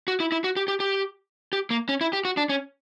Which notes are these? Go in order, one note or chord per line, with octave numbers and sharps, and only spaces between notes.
F#4
E4
E4
F#4
G4
G4
G4
G4
A#3
C#4
E4
G4
F#4
D4
C#4